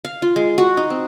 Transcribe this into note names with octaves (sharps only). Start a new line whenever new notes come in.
F5
F4
G#3
F#4
D#4
C4